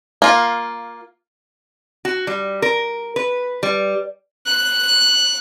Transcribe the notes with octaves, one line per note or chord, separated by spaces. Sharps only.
A#3 F4
F#4
G3
A#4
B4
G3
F#6